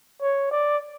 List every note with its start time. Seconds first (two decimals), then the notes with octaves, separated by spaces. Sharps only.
0.22 C#5
0.51 D5